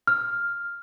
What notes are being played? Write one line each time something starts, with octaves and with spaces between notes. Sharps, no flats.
F6